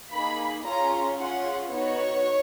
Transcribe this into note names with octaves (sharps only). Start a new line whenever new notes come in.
A#3 D#4 G#4 B5
C#4 F4 G#4 A#5
C#4 F4 G#4 F#5
B3 D#4 F#4 C#5